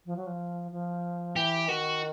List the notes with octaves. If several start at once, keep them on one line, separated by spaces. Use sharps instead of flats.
F3
F#3
F3
F3
E3 G4
D#3 F#4